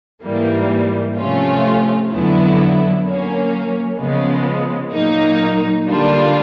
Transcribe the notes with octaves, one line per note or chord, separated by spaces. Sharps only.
G#2 E3 G3 A#3
C3 F3 A3 C#4 F4
F2 D3 F#3 B3 E4
F#3 A#3 C#4
C#3 F3 G#3 B3
A#2 F#3 A#3 D#4
D3 G3 A#3 D4 F4